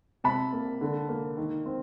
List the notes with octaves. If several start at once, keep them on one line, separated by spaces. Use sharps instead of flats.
C3 A5 B5
A#3
D3
A#3
D#3
C4